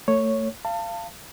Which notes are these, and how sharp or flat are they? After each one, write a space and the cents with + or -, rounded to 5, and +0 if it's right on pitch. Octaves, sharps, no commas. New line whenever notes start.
A3 +25 C#5 +0
F5 -25 A5 +30